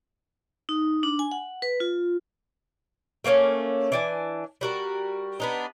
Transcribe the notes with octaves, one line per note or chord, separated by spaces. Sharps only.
D#4
D4
G#5
F#5
B4
F4
A3 A#3 C4 C#4
E3 D4 G#5
G3 F#4 A#4
B3 D4 D#4